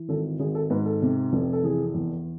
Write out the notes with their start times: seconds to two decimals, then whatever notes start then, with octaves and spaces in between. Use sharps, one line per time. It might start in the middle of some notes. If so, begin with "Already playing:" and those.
Already playing: E3
0.09 G#1 A4
0.40 G#1 G#4
0.55 A4
0.70 G#2 B4
0.86 A4
1.02 C3
1.33 F1
1.53 A4
1.63 E3 G#4
1.94 E2